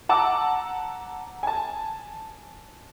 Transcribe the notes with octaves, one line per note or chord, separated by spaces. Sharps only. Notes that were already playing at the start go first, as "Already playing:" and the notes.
F#5 A5 A#5 D6 E6
G#5 A5